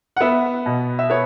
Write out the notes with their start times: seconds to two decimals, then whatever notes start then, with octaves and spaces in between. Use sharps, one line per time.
0.16 F#5
0.20 B3 E5
0.66 B2
0.99 E5
1.10 B3 C#5